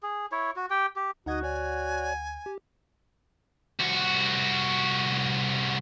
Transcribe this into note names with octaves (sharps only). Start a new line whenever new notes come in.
G#4
E4 C#5
F#4
G4 G5
G4
D2 D#4 F#4 D#5 F#5 G#6
C#5 D5 G#5
G4
C2 F#4